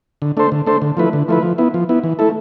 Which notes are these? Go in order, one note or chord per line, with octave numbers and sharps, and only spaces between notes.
D3
A3 D4 A4 C5
D3
A3 D4 A4 C5
D3
F3 A3 E4 B4
D3
F3 A3 E4 B4
F3
B3 E4
F3
B3 E4
E3
A3 E4 A4